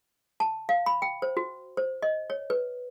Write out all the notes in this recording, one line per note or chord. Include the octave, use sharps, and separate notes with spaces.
A5
F5
B5
G5
C5
F#4
C5
D#5
C#5
B4